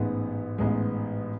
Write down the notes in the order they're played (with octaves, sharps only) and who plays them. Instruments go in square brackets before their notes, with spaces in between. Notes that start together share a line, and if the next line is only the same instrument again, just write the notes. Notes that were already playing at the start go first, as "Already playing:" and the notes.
Already playing: [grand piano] A1 G#2 G#3 B3
A1 G#2 G#3 B3